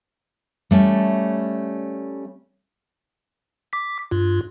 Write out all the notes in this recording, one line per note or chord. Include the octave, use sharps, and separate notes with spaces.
G3 A3 C#4
D6 B6
G2 F4